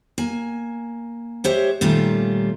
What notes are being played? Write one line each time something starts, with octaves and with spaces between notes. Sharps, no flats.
A#3 G#5
G#3 G4 C5 C#5 E5
A#2 D#3 G3 A3 C#4 F4